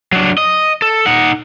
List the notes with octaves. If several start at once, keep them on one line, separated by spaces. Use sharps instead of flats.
F#3 D4
D#5
A4
D#4 F#5